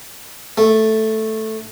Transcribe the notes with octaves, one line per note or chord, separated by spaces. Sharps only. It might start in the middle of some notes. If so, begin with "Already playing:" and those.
A3